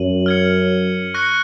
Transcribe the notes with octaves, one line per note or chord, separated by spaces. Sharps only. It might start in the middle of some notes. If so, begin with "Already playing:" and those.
Already playing: F#2 D#7 F#7
F6 G#6 C#7
C#6 F#6 A#6 C#7